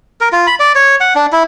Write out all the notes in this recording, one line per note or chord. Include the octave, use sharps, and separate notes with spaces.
A#4
F4
B5
D5
C#5
F#5
D4
E4